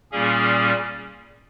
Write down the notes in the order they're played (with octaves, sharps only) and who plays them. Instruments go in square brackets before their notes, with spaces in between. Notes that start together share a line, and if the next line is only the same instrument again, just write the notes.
[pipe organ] A#2 G3 A#3 C#4 G#4